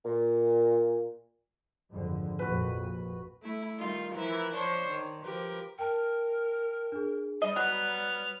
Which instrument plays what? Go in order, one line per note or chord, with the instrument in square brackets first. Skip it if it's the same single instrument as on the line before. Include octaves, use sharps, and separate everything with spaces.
[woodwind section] A#2
[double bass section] G#1 F2 D3
[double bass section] A#1 F2 A#2 [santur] F#4 B4
[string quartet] A3 E4
D#3 G3 D#4 F4
E3 F3 E4 A#4
F3 D4 C5 C#5
D#3
F3 G4 A#4 B4
[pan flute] A#4 [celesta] G5 A5
[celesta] D4 G#4
[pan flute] G3 [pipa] D#5
[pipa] F#3 [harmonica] B3 F6 [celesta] F#6